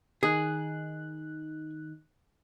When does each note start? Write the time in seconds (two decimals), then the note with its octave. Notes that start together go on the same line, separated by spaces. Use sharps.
0.23 D#3 D#4 G#4 F#6